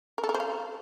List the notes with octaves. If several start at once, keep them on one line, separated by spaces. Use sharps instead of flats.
A#4
A4
A#4
C5
F5